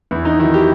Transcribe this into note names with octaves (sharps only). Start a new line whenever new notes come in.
E2 E4
D#4
D#3 F#3 E4
G4